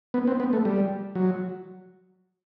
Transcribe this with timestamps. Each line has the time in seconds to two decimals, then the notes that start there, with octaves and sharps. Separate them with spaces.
0.14 B3
0.27 C4
0.40 B3
0.53 A3
0.65 G3
1.15 F#3